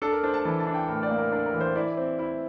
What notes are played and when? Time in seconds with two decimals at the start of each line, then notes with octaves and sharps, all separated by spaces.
0.02 D4 A4
0.13 A#4
0.23 D4 C5
0.34 A5
0.45 E3 A5
0.60 A5
0.67 D4
0.74 G5
0.88 A2 A#4
1.03 D5
1.10 A#3
1.18 A#4
1.32 D4 A#4
1.46 A#4
1.54 E3
1.60 C5
1.75 E4 D5
1.97 C4
2.19 E4